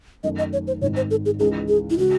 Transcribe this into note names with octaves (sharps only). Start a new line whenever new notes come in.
F#2 D#3 A3 D#5
D#5
C#5
C5
G#1 G#2 D#3 C#5
C5
A4
G#4
C#2 C#3 E3 G#3 D#4 G#4
G#4
E4
C#3 G#3 F#4